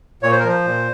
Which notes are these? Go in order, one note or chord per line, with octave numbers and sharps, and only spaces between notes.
A#2 C#5
C5
A#4
F3 C5
A#2